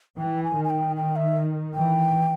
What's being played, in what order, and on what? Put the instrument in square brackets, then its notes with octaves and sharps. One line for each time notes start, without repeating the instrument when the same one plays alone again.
[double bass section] E3 [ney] G5
[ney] G#5
[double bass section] D#3
[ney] G#5
G5
G5
E5
[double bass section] E3 [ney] G5